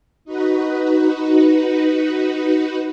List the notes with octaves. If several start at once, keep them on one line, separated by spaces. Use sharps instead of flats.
D#4 F#4 B4